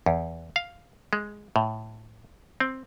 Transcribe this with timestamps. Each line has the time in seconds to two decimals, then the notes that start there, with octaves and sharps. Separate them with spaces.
0.06 E2
0.56 F5
1.13 G#3
1.56 A2
2.60 C4